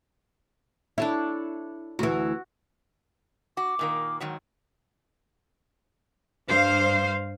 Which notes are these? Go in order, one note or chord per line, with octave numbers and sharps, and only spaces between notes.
D4 E4 A4 C#5
D2 E3 F#4
F#4 D6
A#2 D#3 A#3
G#2 D#3 F#3
G2 C5 F5